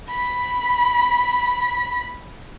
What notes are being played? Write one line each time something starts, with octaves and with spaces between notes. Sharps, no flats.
B5 B6